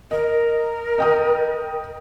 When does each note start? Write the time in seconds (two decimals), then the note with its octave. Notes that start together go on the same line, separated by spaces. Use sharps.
0.11 A#4 D#5
0.98 D#5 G5 D#6